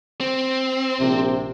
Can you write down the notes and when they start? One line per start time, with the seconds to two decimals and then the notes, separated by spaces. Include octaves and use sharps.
0.21 C4
1.00 A#1 C3